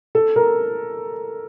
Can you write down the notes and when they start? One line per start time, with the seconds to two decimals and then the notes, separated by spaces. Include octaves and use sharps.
0.15 A4
0.36 A#4